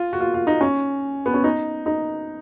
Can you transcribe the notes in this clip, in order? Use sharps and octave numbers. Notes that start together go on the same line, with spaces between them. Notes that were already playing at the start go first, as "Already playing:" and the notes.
Already playing: F4
F#4
F4
F4
D#4
C#4
B3
C#4
D#4
D#4